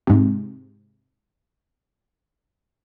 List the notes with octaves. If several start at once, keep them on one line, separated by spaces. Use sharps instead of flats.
G#2 C3